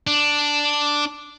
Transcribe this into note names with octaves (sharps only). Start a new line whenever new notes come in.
D4